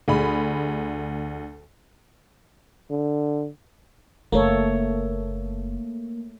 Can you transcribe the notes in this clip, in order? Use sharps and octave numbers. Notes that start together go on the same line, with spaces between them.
D2 G#4 B5
D3
F#1 A3 A#3 A4 C#5